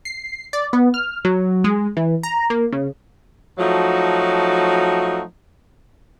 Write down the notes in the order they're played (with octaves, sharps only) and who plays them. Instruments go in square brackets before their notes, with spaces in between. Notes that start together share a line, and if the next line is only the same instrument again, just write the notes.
[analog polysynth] C7
D5
B3
F6
F#3
G#3
E3
A#5
A#3
C#3
[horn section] F3 F#3 A3 D#4 F#4